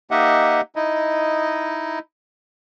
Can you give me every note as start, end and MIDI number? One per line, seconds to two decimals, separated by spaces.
0.11 0.61 58
0.11 0.61 63
0.11 0.61 67
0.11 0.61 75
0.11 0.61 76
0.11 0.61 78
0.76 1.99 63
0.76 1.99 64
0.76 1.99 75